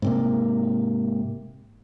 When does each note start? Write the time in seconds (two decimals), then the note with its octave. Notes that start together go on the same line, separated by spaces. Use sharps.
0.02 G#2 C3 A#3